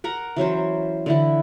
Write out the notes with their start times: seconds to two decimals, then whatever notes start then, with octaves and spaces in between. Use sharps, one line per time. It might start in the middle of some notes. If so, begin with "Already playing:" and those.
0.04 A#4 F#5 A#5
0.36 E3 F#3 C#4 C5
1.06 D3 E3 E4